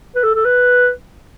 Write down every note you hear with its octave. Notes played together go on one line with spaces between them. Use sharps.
B4
A4
A4
B4